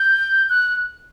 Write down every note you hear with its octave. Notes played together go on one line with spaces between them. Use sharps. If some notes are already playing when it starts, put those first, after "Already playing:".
Already playing: G6
F#6